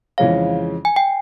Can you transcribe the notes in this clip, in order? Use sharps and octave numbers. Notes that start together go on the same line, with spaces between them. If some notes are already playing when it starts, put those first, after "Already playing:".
F2 C#3 E3 G#3 C#4 F5
G#5
G5